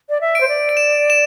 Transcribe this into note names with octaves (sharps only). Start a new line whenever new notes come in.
D5
E5
D7
C5
D5
D7
E7
E7